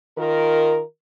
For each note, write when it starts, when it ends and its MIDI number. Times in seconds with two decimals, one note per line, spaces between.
0.18 0.81 51
0.18 0.81 65
0.18 0.81 70